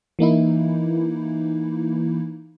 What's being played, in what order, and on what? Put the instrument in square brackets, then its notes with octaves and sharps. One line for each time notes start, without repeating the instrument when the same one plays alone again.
[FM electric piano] E3 A#3 D#4 E4